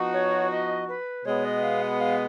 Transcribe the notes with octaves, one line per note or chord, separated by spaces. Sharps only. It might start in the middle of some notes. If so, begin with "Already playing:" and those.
Already playing: F3 B3 D#4 F#4
C#5
D#5
B4
B2 G#3 B3 C#5
D#5
F5
F#5
F5